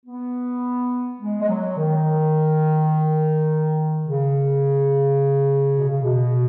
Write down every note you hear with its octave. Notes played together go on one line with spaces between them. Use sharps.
B3
G#3
G#3
F#3
D#3
C#3
B2
C#3
B2